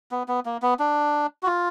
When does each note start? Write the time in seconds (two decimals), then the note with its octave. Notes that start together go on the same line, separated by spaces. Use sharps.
0.11 B3
0.28 B3
0.46 A#3
0.62 B3
0.79 D4
1.43 F#4
1.46 F4